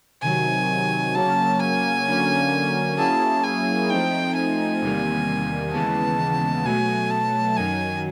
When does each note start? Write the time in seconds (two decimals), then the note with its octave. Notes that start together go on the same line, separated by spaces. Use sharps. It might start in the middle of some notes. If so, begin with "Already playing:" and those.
0.22 C3 D#3 F#3 G#5
1.14 C#3 F#3 A#3 C#4 A5
1.60 G#5
2.06 D3 F#3 A#3 C#4
2.97 F#3 A#3 C#4 E4 G#4 A5
3.44 G#5
3.89 F3 A3 C4 D#4 G5
4.35 G#5
4.81 E2 C3 D#3 G3 A#3
5.73 D#2 C#3 E3 G#3 B3 A5
6.64 B2 F#3 A3 G#5
7.10 A5
7.56 F#2 D#3 F#3 G#5